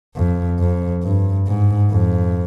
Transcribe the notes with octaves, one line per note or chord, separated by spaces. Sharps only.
F2
F2
G2
G#2
F2